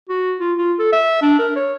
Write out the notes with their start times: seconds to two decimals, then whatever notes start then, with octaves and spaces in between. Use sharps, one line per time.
0.09 F#4
0.40 F4
0.58 F4
0.79 A4
0.92 E5
1.22 D4
1.39 A#4
1.56 C#5